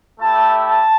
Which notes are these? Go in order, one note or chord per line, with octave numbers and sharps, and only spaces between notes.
A3 E4 G4 A5
A5